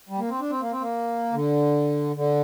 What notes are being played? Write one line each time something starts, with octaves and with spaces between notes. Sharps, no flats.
G3
A#3
C4
D4
C4
A#3
C4
A#3
D3
D3